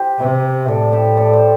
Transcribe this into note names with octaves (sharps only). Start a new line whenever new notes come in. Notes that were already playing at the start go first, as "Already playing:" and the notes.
Already playing: G4 C5
C3
A2 A4 D5
G4 C5
A4 D5
G4 C5